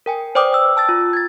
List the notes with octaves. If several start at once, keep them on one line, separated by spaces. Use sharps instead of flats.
A#4 G5 G#5
B4 C5 D5 G5 D6 D#6
G5 E6
A5 E6 A6
F4
G#6 A6